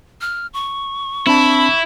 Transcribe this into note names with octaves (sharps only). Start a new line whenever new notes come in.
F6
C#6
C4 D4 E4 A5 B5